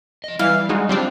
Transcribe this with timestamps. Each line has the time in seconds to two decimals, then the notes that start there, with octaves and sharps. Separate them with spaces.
0.24 F3 D#5
0.39 E3 G3 F5
0.69 G#3 D#4 F#4
0.89 G3 C4 D4 F4 C5